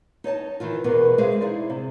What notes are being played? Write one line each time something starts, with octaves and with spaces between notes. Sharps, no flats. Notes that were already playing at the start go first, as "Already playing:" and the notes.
D#4 C#5 D#5 A5
D#3 E3 F4
E2 B2 B3 A#4
G#3 G#4 C5 E5 F5
D#4 E4 G#4 D5
C3